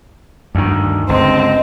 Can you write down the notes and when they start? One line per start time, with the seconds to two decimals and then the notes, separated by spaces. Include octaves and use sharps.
0.55 D2 G2 D#3
1.09 G1 C#2 D3 C4 D#5